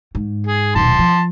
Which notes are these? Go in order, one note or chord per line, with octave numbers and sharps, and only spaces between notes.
G#2
G#4
D#1 B1 A5 C6
F3